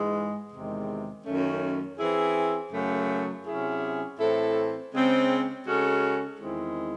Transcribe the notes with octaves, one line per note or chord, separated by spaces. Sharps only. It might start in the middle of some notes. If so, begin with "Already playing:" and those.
Already playing: G#2 E3 G#3
E2 C3 D#3 G#3
F#2 D#3 A3 C#4
E3 C4 E4 G#4
F#2 C#3 F#3 A3
C3 F#3 C#4 E4 G#4
A2 E3 C4 E4 A4
C#3 G#3 C4
C#3 G#3 C#4 F#4 A4
E2 D#3 G#3 C4 E4